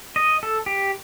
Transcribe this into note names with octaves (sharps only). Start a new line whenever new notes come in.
D#5
A4
G4